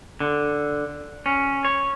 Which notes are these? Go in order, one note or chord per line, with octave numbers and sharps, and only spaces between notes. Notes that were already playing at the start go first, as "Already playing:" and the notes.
D3
C#4
C#5